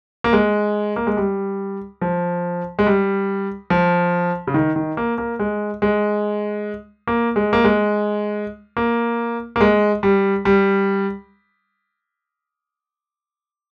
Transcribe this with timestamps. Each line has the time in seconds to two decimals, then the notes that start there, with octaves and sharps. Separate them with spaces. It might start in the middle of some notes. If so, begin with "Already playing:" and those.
0.24 A#3
0.33 G#3
0.96 A#3
1.07 G#3
1.17 G3
2.02 F3
2.79 G#3
2.87 G3
3.70 F3
4.47 C#3
4.54 D#3
4.76 D#3
4.97 A#3
5.18 A#3
5.39 G#3
5.82 G#3
7.07 A#3
7.36 G#3
7.53 A#3
7.64 G#3
8.77 A#3
9.56 A#3
9.61 G#3
10.03 G3
10.45 G3